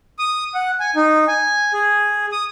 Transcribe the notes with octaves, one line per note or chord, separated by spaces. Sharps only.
D#6
F#5
G#5
D#4
G#5
G#4
D#6